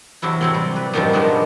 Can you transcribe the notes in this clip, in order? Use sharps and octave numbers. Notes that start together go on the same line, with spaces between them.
E2 C3 F#3 E4
C3 F#3 C4
G3
B4
F#2 C3 D#3 F3 G3
A#2 D#3 G#3 B3 D4 A#4